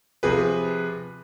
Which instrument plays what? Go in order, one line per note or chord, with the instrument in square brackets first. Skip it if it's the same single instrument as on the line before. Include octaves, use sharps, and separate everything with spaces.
[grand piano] C3 F3 G#4 B4